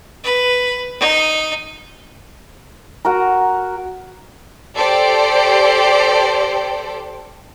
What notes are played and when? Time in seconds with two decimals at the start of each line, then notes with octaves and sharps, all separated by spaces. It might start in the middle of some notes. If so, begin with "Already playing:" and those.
0.23 B4
0.99 D#4
3.05 F#4 A#4 A#5
4.77 G4 A4 C5 D5